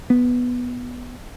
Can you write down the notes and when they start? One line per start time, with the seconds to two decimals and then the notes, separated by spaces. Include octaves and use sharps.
0.10 B3